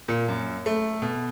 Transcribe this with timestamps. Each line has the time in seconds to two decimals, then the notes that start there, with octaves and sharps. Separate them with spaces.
0.08 A#2
0.28 F#2
0.66 A3
1.02 B2